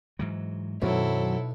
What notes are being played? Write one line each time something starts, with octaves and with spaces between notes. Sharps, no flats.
G#2 E3 F#3
B1 F#2 D#3 F#3 C4 E4 A4